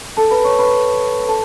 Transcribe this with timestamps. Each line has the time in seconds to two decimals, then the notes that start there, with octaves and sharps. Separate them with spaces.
0.17 A4 A5
0.31 B4 B5
0.45 C#5 C#6
0.59 B4 B5
1.28 A4 A5